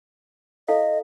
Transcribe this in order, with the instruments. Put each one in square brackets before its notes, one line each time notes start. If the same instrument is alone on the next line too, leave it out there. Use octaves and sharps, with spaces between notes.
[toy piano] E4 A4 F5 [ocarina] D#5